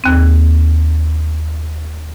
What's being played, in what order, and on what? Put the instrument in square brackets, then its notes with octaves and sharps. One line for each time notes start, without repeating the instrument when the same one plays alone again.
[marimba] D#2 C4